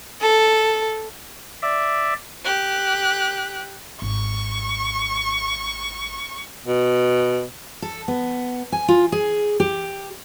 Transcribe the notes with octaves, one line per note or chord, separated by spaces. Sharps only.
A4
D5 E5
G4 F#6
G#1 C#6
B2
A4
B3
G#5
F4
G#4
G4